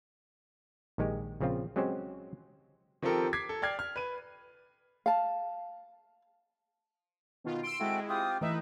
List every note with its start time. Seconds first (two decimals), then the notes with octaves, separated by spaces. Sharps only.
0.98 A#1 D#3 G#3 G4
1.40 A#1 C#3 F3 C4 F4
1.76 F#3 G#3 C4 C#4 G4 C5
3.02 D#3 F3 C4 G4 A4 A#4
3.33 D6 G#6 B6 C7
3.49 A4
3.62 D5 G5 F6 G#6 C7
3.79 F6
3.96 B4 D#7
5.06 F5 A5
7.44 B2 D#3 F4
7.63 C6 E6 D7
7.80 G#3 C4 E4 F#4 A4
8.09 C4 F4 G4 D#6
8.41 E3 A3 D#4 B4 D#5 E5